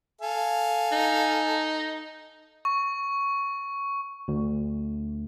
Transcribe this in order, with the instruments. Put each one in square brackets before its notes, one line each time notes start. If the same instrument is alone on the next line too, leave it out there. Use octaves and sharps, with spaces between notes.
[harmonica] A4 F5 G#5
[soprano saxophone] D#4
[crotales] C#6
[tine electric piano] D2